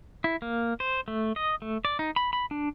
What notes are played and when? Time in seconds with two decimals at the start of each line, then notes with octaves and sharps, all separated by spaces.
0.24 E4
0.42 A#3
0.80 C5
1.08 A3
1.36 D#5
1.62 A3
1.85 D5
1.99 D#4
2.16 B5
2.33 B5
2.51 D4